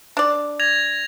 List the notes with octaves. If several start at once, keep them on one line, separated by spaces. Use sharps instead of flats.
D4 D5
G#6 A#6 F7